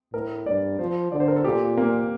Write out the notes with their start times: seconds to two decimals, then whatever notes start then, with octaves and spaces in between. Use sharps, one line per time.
0.13 A2 A#4
0.46 G2 D5
0.79 F3 C5
1.12 D3 D5
1.20 C5
1.28 A#4
1.36 A4
1.44 A#2 G4
1.77 A#3